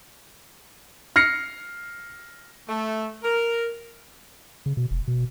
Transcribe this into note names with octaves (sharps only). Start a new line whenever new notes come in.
F6 A#6 C7 C#7
A3
A#4
C#3
B2
F1
B2